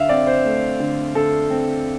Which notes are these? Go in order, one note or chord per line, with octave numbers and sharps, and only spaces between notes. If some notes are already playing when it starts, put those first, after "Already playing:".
Already playing: D3 E5 F5
C4 D5
C5
A3
D3
D3 A4
C4